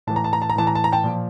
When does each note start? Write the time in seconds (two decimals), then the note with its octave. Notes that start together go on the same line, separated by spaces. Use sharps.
0.07 A2 E3 A5
0.16 A#5
0.24 A5
0.33 A#5
0.42 A5
0.50 A#5
0.55 A2 E3 A5
0.67 A#5
0.75 A5
0.84 A#5
0.92 G5 A5
1.04 A#2 F3